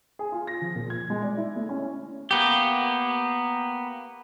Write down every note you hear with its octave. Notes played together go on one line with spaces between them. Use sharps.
G#4
F4
A#6
F3
A#2
G#6
G#3
D5
E4
A3
C#4
A#3 B3 G4